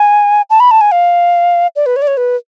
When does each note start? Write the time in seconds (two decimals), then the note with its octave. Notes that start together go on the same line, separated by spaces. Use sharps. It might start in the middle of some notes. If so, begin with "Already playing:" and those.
Already playing: G#5
0.50 A5
0.60 B5
0.71 A5
0.81 G#5
0.91 F5
1.76 D5
1.86 B4
1.96 C#5
2.02 D5
2.07 C#5
2.17 B4